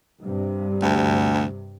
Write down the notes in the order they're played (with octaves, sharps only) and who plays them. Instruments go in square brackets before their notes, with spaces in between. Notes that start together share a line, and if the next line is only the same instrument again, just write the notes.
[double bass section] G2 C3
[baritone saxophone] D2